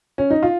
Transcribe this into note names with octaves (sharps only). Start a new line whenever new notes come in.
C#4
D#4
F4